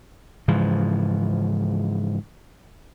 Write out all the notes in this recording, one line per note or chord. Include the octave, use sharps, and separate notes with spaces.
G#2 C#3 E3 F3